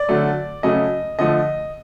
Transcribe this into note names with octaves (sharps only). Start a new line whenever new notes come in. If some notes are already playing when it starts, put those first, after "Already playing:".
Already playing: D5
D3 F#3 A3
C#3 F#3 A3 D#5
D3 F3 A3 D#5